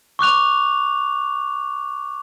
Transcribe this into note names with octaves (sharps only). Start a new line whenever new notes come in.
C#6 D6 F#6 F7